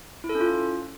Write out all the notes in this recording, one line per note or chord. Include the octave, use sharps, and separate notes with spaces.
E4
A4
C#4
F4